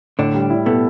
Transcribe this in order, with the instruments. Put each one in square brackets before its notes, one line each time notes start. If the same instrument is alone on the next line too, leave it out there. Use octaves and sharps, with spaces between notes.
[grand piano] A2 [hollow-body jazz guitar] D3 D4
[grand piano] G3
E4
[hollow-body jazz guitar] B2 B3 [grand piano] A4